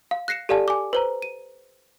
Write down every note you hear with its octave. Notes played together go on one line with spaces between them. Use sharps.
F5
F#6 A#6 C7 C#7 E7
G4 A4 D5 F5 G#5 A5
G#5 D6
B4 C5 A#5
D#7